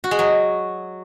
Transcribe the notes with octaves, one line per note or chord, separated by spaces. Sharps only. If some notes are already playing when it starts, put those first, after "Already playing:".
F#4
G#3
F#3